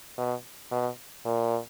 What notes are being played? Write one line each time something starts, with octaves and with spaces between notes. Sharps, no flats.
B2
B2
A#2